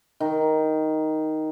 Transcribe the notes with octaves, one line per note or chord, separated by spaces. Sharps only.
D#3